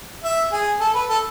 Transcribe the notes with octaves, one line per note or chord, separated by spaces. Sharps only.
E5
G#4
A4
B4
A4